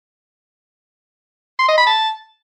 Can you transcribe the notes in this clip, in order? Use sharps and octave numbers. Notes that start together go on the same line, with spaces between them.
C6
D#5
B5
A5